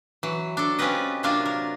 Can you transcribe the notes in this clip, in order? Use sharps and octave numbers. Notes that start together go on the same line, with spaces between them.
E3 F#3
D4 A4
C4 C#4 F4 G4 B4 D#5
C3 F#3 A#3 D4 F4 A#4
A#4